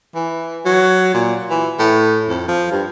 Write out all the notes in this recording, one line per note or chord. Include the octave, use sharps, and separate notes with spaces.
E3
F#3
A#2
E3
A2
F2
F3
G2